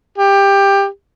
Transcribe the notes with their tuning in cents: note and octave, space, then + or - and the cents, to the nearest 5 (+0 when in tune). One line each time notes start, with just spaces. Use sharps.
G4 +15